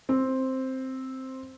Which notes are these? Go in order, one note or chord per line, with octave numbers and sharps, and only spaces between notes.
C4